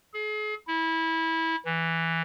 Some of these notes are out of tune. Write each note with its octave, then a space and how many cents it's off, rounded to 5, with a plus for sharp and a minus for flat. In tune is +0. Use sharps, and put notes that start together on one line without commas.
G#4 +40
E4 -20
E3 +0